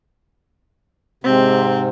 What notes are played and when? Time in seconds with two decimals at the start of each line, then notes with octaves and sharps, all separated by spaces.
1.24 G#2 C3 C4